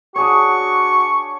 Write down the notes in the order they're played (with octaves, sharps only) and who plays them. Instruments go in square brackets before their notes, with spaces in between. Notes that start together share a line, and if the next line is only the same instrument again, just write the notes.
[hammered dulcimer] D4 G#4 C#5 [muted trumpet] F#4 [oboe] C#6